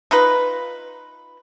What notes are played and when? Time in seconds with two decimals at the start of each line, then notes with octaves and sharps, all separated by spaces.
0.11 D#4 F4 B4